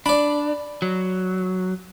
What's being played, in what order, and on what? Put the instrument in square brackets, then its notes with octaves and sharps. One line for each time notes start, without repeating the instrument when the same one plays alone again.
[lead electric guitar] D4 [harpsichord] D5 B5
[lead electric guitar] F#3